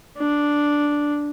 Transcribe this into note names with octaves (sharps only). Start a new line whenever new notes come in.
D4